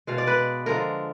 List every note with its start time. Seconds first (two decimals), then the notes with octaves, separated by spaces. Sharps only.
0.07 B2 G#3 F5
0.18 D5
0.27 B4
0.66 D3 F3 G#3 A#4